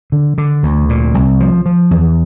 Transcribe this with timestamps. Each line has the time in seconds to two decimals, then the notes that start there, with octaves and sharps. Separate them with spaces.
0.12 D3
0.38 D3
0.63 D2
0.89 A#2
1.15 C2
1.40 F3
1.66 F3
1.91 E2